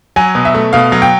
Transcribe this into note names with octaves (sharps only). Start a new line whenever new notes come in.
F#3 G#5
B2
E5
A3
B2 F5
F#3
G5